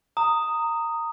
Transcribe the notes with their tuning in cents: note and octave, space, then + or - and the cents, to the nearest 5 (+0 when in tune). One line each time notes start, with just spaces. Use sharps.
A#5 -20 D#6 +0